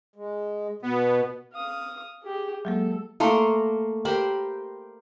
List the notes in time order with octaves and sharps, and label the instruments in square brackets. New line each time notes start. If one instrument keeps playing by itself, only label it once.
[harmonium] G#3
[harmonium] B2 [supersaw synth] B3
[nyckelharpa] F5 D#6
G4 G#4
[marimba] F#3 G#3 A#3 [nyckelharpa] A4
[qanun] A3 A#3 A#4 C6
G4 A#4 C5 B5